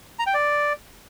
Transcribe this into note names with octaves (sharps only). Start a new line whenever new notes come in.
A#5
G5
D5